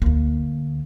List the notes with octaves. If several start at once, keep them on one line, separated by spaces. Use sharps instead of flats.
D2 A#3